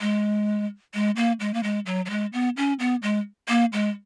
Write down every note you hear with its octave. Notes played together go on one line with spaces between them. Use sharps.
G#3
G#3
A#3
G#3
A#3
G#3
F#3
F#3
G#3
B3
C#4
B3
G#3
A#3
G#3